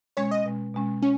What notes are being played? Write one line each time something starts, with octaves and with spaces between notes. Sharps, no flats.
B2 G#3 C#4 C#5
D#5
B2 G#3 C#4
B2 G#3 C#4
C#4